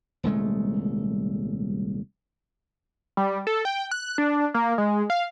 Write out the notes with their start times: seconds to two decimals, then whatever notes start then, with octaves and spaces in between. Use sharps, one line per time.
0.23 D#1 C2 G#3 A3
3.17 G3
3.47 A4
3.65 G5
3.91 F#6
4.18 D4
4.54 A#3
4.78 G#3
5.10 F5